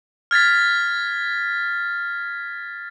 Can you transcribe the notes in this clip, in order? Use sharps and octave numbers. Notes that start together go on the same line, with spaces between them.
F6 G#6 A6 B6